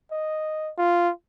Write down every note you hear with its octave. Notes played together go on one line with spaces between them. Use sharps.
D#5
F4